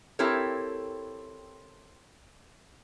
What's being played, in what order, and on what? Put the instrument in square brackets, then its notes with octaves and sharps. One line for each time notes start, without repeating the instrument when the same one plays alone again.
[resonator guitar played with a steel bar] C4 E4 G4 A4 A#4 C#5